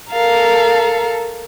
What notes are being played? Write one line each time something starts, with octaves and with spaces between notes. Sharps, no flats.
A4 A#4 F5 A#5